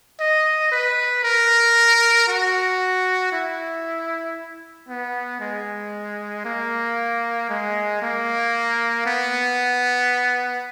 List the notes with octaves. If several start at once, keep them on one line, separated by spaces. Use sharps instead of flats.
D#5
B4
A#4
F#4
E4
B3
G#3
A#3
G#3
A#3
B3